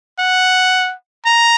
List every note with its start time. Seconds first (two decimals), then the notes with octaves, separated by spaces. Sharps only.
0.19 F#5
1.25 A#5